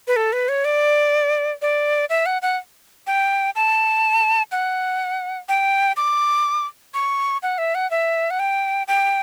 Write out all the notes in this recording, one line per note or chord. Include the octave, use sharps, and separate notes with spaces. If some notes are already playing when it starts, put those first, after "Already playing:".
B4
A4
B4
C#5
D5
D5
E5
F#5
F#5
G5
A5
F#5
G5
D6
C#6
F#5
E5
F#5
E5
F#5
G5
G5